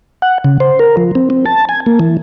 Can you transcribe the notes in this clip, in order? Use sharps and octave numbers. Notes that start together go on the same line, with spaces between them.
F#5
C#3
C5
A#4
F3
C4
C4
A5
G#5
A#3
E3